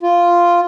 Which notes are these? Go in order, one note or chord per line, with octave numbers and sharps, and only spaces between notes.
F4